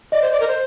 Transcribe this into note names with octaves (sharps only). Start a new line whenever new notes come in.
D5 D#5
C5
D5
A#4
C5